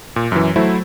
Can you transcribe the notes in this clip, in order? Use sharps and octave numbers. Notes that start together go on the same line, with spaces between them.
A#2
F#2 E3
F#3 A3 E4 C5